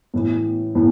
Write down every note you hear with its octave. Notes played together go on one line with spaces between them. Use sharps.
A2 E3
A2 E3